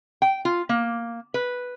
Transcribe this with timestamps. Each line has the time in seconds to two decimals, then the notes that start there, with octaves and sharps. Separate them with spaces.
0.22 G5
0.45 F4
0.69 A#3
1.34 B4